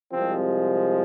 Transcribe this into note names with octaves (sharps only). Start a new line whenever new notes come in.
C2 C3 F3 G#3 C4